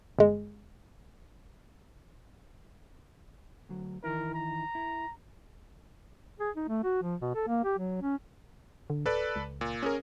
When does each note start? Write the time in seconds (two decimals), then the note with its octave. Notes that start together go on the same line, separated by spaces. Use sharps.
0.19 G1 G#3
3.69 D2 F#3
4.04 D#3 E3 E4 A#4
4.34 A#5
4.75 E4
6.40 G#4
6.56 D#4
6.68 A3
6.83 F#4
7.02 F3
7.21 B2
7.35 A4
7.48 A#3
7.64 G4
7.78 F#3
8.01 C#4
8.90 D3
9.06 D1 A4 B4 D5
9.36 C#2
9.61 A#2
9.82 C#4 G#4 A#4